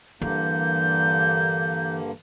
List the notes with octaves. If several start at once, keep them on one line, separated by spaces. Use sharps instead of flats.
G2 D3 E3 A#3 G6